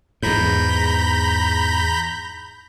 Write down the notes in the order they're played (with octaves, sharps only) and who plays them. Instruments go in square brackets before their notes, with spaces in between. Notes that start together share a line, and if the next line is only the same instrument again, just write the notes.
[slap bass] E2 G#2 [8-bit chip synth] A#5 B5 G6